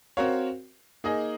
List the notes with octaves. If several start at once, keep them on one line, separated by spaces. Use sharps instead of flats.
C4 F#4 A#4 C#5 F5
A#3 D#4 G#4 D#5